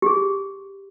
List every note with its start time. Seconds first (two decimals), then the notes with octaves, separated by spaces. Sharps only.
0.02 G4 G#4